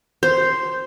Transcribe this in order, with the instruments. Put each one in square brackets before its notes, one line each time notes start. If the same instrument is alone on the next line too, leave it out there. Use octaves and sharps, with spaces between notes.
[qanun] C5